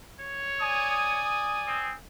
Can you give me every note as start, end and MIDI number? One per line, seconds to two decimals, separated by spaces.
0.20 1.21 73
0.61 1.93 74
0.61 1.93 80
0.61 1.93 87
1.67 1.94 60